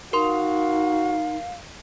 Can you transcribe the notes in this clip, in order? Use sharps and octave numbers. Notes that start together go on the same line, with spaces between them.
D#4 F#4 A#4 F5 C6